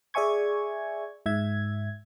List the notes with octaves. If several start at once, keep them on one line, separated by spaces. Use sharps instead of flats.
G#4 D5 E5 G#5 C#6 G#6
G#2 E5 G#6